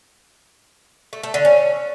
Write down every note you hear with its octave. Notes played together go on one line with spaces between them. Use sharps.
A3
A3
D3
C#4